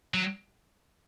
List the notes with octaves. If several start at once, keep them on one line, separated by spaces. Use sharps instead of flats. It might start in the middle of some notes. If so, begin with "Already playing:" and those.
F#3